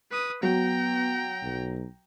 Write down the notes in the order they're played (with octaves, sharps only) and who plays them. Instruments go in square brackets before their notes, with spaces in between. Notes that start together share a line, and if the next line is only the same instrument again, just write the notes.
[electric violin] B4 D#6
[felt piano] F#3 [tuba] B3 [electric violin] G5 A#5
[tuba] B1